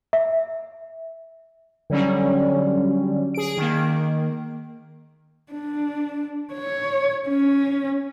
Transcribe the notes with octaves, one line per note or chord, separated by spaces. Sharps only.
E5
D3 F#3 G3 C#4
G#4 D7
D#3 A#3
D4
C#5
C#4